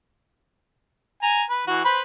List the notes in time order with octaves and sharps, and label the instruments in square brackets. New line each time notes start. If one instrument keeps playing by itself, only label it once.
[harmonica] G#5 A#5
B4
E3 F#4
B4 C5 B5